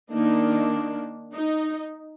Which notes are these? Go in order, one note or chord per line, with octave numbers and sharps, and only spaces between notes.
D#3 A#3 D4 D#4
D#4